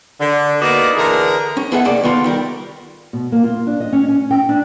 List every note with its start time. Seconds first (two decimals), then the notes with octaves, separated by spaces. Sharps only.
0.20 D3
0.61 A#3 B3 D#4 F#4 D5
0.96 D3 E3 E4 G#4 A#4
1.57 C#4
1.72 B3 G#4 A4 D#5 E5 F#5
1.85 B1 C3 A#3 D5
2.04 D#3 B3 F4 A4
2.24 D#3 G3 A#4
3.13 B2
3.32 A#3
3.44 F4
3.67 D4
3.80 D#5
3.93 C#4
4.08 C#4
4.31 G5
4.49 D4